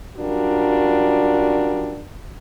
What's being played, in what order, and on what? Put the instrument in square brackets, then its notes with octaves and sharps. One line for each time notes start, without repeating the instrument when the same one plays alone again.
[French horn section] F#2 G3 D4 F4 F#4 A#4